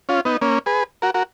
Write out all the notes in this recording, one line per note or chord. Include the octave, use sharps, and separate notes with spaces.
C#4 F4
B3 D#4
A#3 C#4
G#4 B4
F#4 A#4
F#4 A#4